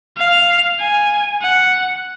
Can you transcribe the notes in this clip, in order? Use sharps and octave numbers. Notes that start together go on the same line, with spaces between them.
F5
G#5
F#5